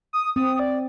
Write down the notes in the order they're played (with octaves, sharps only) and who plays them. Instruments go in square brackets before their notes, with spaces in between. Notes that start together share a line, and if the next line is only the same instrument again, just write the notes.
[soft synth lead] D#6
[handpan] C4 [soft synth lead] D#6
[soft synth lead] D5